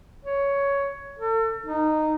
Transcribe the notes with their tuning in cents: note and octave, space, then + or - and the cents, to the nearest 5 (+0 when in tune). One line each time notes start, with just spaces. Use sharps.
C#5 +10
A4 +35
D#4 -10